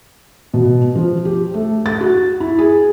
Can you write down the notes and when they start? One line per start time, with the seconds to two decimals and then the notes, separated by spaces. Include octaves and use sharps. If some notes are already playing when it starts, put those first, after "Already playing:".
0.54 B2
0.95 F3
1.25 G4
1.54 A3
1.86 A6
2.01 F#4
2.40 E4
2.59 G#4